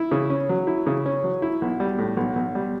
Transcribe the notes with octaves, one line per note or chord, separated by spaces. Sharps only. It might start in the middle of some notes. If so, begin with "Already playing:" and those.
Already playing: E4
C#3
C#4
F#3
E4
C#3
C#4
F#3
E4
B1
G3
A2
B1
B1
G3